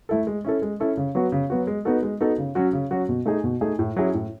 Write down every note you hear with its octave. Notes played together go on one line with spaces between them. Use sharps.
A3 E4 A4
G#3
C#4 E4 A4
G#3
C#4 E4 A4
C#3
F#3 B3 F#4
C#3
F#3 B3 F#4
G#3
B3 D#4 F#4 A4
G#3
B3 D#4 F#4 A4
C#3
F#3 C#4 F#4
C#3
F#3 C#4 F#4
B2
A3 D#4 G#4
B2
A3 D#4 G#4
A2
F#3 C#4 E4 G#4
A2